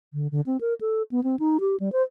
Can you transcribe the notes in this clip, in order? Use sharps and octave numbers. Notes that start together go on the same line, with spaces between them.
D3
D3
C4
A#4
A4
B3
C4
D#4
G4
G3
C5